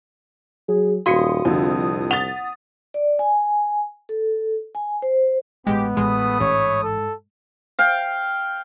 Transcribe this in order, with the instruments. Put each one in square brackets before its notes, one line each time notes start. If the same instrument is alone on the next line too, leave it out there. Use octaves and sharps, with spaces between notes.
[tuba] F#3 [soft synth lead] G#4
[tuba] D#1 [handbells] F#4 F5 [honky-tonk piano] C6 C#7 [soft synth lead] D#6
[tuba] C2 [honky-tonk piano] F2 D3
[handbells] F#5 [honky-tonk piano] A6 F7
[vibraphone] D5
G#5
A4
G#5
C5
[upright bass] A1 [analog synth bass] G#3 [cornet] B3 [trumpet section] G4
[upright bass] A1 [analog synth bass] G#3 [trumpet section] A3 B5 D#6
[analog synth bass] A1 [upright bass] G#2 [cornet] C#5
[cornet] A4
[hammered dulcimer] F5 G5